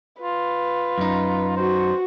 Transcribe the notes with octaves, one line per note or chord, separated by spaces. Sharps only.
F4 B4
F#2 D#4
F#4 C5